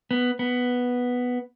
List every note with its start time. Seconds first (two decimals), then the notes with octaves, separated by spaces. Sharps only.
0.11 B3
0.39 B3